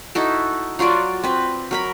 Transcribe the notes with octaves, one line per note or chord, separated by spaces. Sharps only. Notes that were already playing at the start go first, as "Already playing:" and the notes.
D#4 E4 F#4 A4
F#3 F4 F#4 D5
C4 B4
F#3 A#4 B5